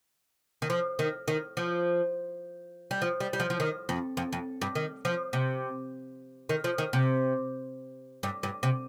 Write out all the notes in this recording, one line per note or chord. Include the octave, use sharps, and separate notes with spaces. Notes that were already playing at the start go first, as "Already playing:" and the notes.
D#3
F3
D#3
D#3
F3
G3
F3
G3
G3
F3
F3
D#3
F2
F2
F2
G2
D#3
F3
C3
D#3
F3
D#3
C3
G2
G2
C3